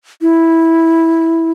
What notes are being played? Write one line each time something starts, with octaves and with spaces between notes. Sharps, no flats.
E4